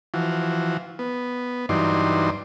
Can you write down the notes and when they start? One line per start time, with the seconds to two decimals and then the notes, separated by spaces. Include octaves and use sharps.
0.14 E3 F3 F#4
0.99 B3
1.69 G2 E3 F#3 D#4 D5 C6